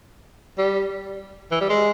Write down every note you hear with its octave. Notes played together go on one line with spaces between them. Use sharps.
G3
E3
G3
G#3